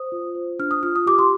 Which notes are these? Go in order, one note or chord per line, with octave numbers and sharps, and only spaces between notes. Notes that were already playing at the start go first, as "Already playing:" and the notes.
Already playing: C5 D#6
F4
C5
D4 F6
D#6
F4 F6
D#6
G4 D6
C6